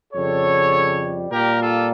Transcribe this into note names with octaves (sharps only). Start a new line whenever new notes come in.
F2 C#3 G3 A4 C#5
A#2 G3 A#3 G4 A#4
F4 A4